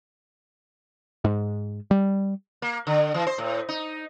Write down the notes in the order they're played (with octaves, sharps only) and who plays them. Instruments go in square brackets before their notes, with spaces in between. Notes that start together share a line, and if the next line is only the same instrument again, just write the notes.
[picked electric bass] G#2
G3
[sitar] A#3
D3
E3
C5
A2
D#4